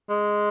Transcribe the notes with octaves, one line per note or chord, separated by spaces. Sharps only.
G#3